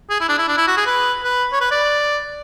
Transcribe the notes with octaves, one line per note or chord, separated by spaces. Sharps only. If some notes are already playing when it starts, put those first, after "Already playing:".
G#4
E4
D4
E4
D4
E4
F#4
G#4
B4
B4
C#5
B4
D5